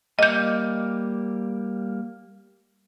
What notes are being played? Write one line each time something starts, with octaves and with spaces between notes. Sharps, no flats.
G3 A#3 D#5 G6